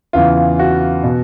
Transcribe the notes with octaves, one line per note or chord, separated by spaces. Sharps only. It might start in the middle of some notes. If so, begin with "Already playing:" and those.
E2 C#3 E3 F4
F#4
B2